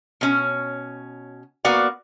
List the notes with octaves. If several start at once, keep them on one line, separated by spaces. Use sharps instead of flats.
B2 C#4
A#3 B3 F#4 D5 F5